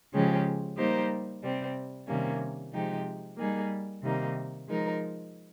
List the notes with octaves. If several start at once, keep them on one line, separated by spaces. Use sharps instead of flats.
C#3 F3 G#3 C#4 G4
G3 A#3 D#4 G4 C5
C3 G3 C4
C3 D#3 G3 A#3 C#4
C3 F3 G#3 D#4 G4
G3 A#3 D#4 G#4
C3 D#3 G3 A#3 D#4
F3 G#3 D#4 A#4